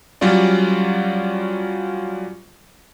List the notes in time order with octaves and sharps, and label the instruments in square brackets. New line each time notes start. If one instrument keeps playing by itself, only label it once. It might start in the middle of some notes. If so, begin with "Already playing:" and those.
[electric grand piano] F#3 G3 C#4 F4 D5